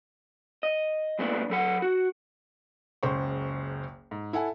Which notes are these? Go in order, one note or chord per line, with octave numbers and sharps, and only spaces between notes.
D#5
G2 A#2 A3 B3 D4
F#3 A4 F#5
F#4
F#1 C#2 C5 C#6
G#2
E4 A4 F#5 G#5